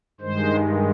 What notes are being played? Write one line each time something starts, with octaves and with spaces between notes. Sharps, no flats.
G2 D#3 G#3 C5